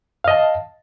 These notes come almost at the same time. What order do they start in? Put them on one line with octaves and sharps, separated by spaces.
F5 D#5 A5